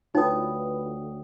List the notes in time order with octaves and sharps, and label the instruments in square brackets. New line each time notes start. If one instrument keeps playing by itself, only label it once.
[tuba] D2 [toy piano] D#4 [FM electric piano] F4 B4 [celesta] C#5 G5 D#6